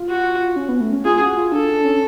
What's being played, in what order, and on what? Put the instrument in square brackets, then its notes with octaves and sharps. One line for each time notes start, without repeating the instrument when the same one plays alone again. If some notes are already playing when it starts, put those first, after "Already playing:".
Already playing: [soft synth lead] F4
[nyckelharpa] F#4
[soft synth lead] C#4
B3
A3
C#4
[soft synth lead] F4 [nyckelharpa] G#4
[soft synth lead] F#4
F4
[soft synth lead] D4 [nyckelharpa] A4
[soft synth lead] D4
C#4